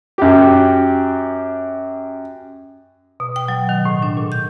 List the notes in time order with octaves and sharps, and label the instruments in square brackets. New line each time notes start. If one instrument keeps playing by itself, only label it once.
[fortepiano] F#2 G4
[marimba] B2
G5
F#3
D#3
A2
D4
A#2
G6